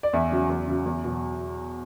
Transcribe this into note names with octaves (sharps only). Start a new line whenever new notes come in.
D5
E2 E5
C#3 F#3
E2
C#3 F#3
E2
B2 F#3